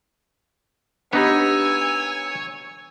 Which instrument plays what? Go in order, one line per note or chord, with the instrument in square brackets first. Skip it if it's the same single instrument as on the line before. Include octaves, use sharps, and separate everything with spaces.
[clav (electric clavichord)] B3 D#4 B4 [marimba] D4 G4 [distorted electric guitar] C#5 [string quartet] G#5 E6